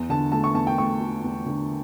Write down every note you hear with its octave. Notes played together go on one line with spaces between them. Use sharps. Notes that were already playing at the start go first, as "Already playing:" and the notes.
Already playing: E2
D3 A5
A3 A5
C#6
E2 A5
G5
A3 C#6
A3
E2
D3